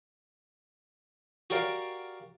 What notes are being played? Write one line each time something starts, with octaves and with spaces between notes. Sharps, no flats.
F#4 G4 A#4 D5 F5